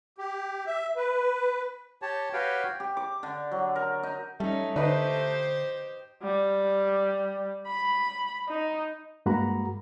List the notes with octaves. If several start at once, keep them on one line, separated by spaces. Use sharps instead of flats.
G4
E5
B4
G4 C#5 A5
F#4 G4 B4 C#5 F5 G5
G4
D6
D3
F#3
A#4
D#4
G3 A3 C#4 D#4
D3 D#4 G4 B4 C5
G3
B5
D#4
G2 G#3 A#3 F#4 A#5 B5